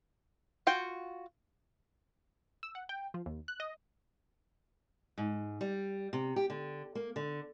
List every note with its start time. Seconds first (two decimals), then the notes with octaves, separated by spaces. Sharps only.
0.67 F4 F#4 G5
2.63 E6
2.75 F#5
2.89 G5
3.14 F3
3.26 D#2
3.48 F#6
3.60 D#5
5.18 G#2
5.61 G3
6.13 C3
6.36 G4
6.50 D3
6.95 A#3
7.16 D3